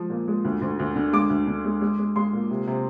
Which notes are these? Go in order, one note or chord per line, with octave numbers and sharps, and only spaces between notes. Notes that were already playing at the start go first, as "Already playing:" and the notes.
Already playing: F3 G#3
A#2
G#3
D2
D2
D2
D3
G#3 D6
D2
D3
G#3
G#3
G#3
G#3 C6
A#2
C3
C3